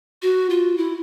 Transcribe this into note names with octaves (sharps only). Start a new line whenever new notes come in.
F#4
F4
E4